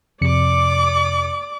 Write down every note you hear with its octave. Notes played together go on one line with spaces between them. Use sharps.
F2 C3 D5 D6 C#7